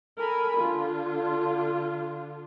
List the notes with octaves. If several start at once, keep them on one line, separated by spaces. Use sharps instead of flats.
A4 A#4 G#5 B5
D3 F4